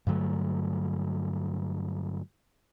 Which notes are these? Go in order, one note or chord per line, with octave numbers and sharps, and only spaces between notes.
G2 D3 F#3 A3